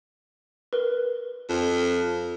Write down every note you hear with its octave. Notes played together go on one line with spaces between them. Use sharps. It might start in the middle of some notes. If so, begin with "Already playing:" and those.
A#4 B4
F2